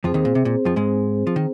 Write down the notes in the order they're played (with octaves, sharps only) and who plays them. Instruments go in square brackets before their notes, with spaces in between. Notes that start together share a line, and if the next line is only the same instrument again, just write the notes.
[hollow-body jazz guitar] F2 F3 [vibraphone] C4 G#4 C5
[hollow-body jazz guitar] D#2 D#3
A#2
C3
A#2
F2 F3
G#2 G#3
F3
D#3